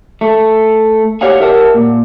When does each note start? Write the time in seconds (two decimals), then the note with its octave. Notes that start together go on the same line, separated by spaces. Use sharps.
0.21 A3
1.21 G4 C#5 F5 F#5 G#5
1.40 G4 A#4 E5 F#5 A5
1.74 A#2